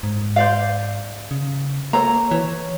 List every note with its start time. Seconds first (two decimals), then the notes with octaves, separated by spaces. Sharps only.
0.03 G#2
0.36 C5 D5 F5
1.31 C#3
1.93 A#3 A4 C#5 A#5
2.31 E3 C#5